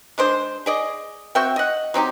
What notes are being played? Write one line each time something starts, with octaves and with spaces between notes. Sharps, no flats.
G#3 D4 C5
G#4 D5 D#5
C4 F#4 E5 G5
D#5 F#5
F#3 C4 D#4 G4